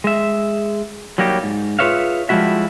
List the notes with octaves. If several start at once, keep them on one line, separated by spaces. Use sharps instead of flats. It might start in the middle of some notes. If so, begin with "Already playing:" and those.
G#3 E5
F#3 G3 A#3 D#4 G4
G#2
F4 G#4 B4 C#5 E5 F5
F3 G3 G#3 E4 F#4 E5